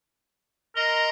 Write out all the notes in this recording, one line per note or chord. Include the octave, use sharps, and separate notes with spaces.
A#4 D#5 A#5 C6